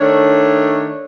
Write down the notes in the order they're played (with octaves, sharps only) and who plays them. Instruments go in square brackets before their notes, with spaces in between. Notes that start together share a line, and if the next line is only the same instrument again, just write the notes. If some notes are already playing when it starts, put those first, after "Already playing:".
[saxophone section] D#3 A3 D4 C#5